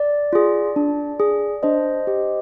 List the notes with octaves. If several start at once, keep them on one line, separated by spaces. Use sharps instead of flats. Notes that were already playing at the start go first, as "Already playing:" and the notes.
Already playing: D5
F4 G#4
D4
G#4
D4 C5 D#5
G4